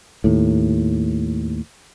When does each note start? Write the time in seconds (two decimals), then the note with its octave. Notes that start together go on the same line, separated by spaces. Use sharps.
0.24 D#2 A2